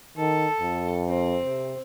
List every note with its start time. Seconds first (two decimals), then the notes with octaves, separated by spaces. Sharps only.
0.17 D#3 A4
0.60 F2
1.07 C4
1.45 C3